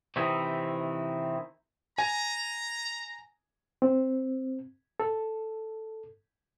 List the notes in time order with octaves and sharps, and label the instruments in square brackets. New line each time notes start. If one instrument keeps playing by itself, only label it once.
[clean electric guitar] C3 D#3 E3 C4 D#4 E4
[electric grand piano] G#5 [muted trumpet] A#5
[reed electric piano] C4
A4